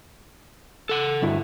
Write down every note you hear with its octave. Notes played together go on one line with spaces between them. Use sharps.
A4 F#5
D2 G2 E4